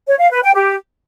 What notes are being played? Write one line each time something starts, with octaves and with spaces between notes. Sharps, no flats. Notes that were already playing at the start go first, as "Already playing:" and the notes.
C#5
F5
B4
G5
G4